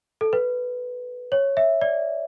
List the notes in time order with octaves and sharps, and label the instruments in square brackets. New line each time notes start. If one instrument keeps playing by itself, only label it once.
[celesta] A4
B4
C#5
E5
D5